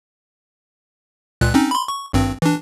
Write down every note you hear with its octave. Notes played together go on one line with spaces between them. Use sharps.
C#2 A#2 F#6
C4 C#4 D#4
B5 C6
C#6
G#1 G2 C4
E3 D4